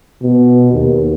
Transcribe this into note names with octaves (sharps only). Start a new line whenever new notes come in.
B2
D#2